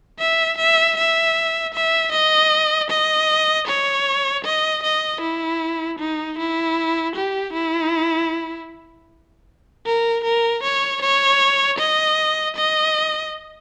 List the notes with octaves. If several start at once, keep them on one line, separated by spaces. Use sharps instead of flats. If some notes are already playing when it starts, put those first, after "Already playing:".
E5
E5
E5
E5
D#5
D#5
C#5
D#5
D#5
E4
D#4
E4
G4
E4
A#4
A#4
C#5
C#5
D#5
D#5